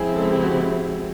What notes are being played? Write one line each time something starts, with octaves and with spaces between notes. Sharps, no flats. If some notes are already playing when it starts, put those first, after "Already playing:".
Already playing: C#3 F3 G#3 C4 E4 G#4
A4
G4
F#4